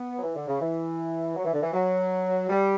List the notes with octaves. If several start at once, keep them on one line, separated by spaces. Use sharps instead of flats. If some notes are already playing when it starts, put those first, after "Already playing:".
Already playing: B3
F#3
E3
D3
C#3
E3
F#3
E3
D3
E3
F#3
G3